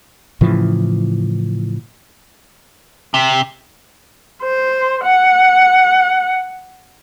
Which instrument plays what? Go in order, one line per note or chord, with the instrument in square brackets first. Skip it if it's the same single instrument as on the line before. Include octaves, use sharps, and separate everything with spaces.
[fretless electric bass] A2 C#3 E3 F3
[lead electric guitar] C3
[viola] C5
F#5